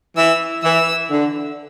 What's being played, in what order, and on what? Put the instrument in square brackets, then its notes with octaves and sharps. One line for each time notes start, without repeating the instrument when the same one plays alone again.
[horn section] E3 [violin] E6
[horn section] E3 [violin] E6
[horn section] D3